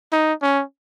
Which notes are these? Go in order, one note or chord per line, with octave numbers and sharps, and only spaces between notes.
D#4
C#4